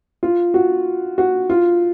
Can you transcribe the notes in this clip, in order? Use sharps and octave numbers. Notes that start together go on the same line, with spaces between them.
F4
F#4
F#4
F4